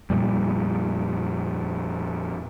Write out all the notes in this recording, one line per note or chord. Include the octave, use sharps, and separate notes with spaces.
F2 A#2 G3